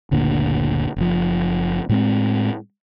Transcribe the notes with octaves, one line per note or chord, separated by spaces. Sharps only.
F#1 D2 A#2 D3
F#1 F3
A2 G#3 C4